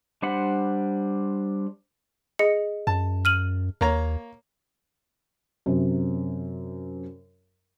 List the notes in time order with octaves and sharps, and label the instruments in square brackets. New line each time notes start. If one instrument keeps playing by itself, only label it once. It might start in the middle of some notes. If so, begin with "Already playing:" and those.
[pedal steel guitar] G3 D4 C5 F#5 B5
[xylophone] G#4 D#5 C#7
[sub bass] F#2 [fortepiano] A5
[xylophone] F6 D#7 F#7
[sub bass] D#2 [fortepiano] A#3 C#5 A#5
[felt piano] F#2 C3